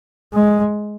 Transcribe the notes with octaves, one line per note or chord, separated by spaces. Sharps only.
G#3